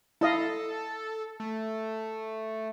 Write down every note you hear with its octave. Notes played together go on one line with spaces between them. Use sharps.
E4 A4 D#5 F5
A3